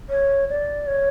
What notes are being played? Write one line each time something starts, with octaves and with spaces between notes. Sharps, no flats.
C#5
D5
C#5